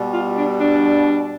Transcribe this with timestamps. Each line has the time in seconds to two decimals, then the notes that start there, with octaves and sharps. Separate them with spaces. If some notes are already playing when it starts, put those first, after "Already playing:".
Already playing: B2 G3
0.12 F4
0.34 D4
0.57 D4